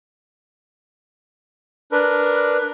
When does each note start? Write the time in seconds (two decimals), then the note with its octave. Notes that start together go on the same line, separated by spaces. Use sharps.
1.92 D4 A#4 B4